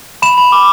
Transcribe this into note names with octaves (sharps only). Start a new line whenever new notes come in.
B5 E7
B5
D6